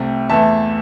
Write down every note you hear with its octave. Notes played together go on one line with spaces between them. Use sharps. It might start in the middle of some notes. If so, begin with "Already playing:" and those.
Already playing: C2 C3 A3 G5
E2 E3 A3 E5 A5